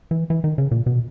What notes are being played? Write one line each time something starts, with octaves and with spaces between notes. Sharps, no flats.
E3
E3
D#3
C#3
A#2
B2